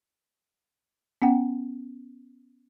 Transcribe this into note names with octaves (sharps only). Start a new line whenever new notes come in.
B3 C#4 F#5 G5